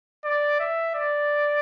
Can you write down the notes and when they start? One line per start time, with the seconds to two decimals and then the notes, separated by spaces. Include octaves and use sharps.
0.24 D5
0.60 E5
0.95 D5